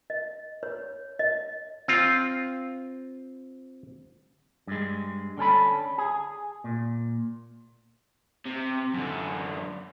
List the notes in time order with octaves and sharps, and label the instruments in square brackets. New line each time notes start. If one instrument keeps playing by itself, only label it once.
[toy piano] D#5
C#5
D#5
[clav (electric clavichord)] C4 F4
[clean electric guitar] G2 G#3
D3 C#4 A4 B5
G#4
A#2
[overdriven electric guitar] C3
F#2 D3